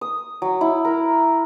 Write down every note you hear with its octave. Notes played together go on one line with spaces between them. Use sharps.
D#6
F#3
E4
A#4